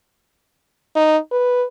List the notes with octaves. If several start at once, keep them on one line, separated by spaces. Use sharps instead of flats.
D#4
B4